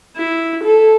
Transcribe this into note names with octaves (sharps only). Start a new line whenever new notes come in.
E4
A4